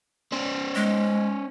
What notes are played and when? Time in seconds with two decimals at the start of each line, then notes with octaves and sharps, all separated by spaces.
0.33 C#4 C5
0.75 G#3